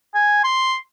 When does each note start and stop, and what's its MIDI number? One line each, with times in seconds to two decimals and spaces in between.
0.15 0.40 80
0.44 0.76 84